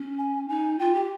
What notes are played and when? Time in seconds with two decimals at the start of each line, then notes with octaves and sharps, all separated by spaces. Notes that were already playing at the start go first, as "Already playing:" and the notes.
Already playing: C#4
0.18 G#5
0.49 D#4 G#5
0.79 F4 G5
0.94 G4